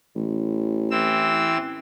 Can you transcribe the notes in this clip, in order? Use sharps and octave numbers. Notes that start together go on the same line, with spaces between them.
A1
E3 C4 E6